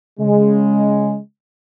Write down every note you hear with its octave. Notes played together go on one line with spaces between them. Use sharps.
C#3 G#3